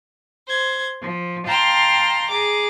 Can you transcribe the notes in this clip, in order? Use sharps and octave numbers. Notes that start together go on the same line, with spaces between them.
C5 G#6
F3
F5 G5 A5 A#5 C6 F6
G#4 A#5 D6